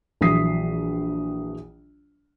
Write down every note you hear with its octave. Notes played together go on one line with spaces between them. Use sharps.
A#1 E3 F#3 D#6 B6 C7